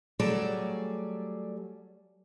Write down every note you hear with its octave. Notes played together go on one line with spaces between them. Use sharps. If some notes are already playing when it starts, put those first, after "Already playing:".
F#3 G3 A3 G#4 D5